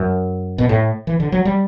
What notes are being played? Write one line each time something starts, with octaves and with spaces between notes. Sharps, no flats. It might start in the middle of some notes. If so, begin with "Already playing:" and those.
Already playing: F#2
B2
A2
E3
D3
F#3
G3